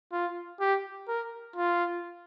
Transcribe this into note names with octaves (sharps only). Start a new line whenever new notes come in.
F4
G4
A#4
F4